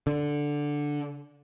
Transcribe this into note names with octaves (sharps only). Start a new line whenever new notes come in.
D3